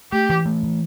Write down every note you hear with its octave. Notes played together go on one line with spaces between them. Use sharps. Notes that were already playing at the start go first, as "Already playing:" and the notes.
A3 G4
E3
A3
E3